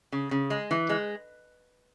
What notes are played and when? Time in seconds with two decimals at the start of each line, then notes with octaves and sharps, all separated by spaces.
0.12 C#3
0.31 C#3
0.50 G#3
0.71 E3
0.89 G#3